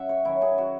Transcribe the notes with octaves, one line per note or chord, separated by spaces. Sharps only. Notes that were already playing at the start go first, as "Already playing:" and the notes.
Already playing: F#3 C#4 E5 F#5
C#5
D#3 F#3 C#4 E4
G#4
F#4